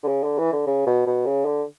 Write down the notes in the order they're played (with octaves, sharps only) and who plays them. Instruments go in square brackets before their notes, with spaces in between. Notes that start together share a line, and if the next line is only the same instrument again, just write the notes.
[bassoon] D3
C#3
D3
E3
D3
C#3
B2
B2
C#3
D3